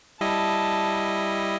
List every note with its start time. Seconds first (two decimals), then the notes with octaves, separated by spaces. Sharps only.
0.21 G3 E4 D#5 A5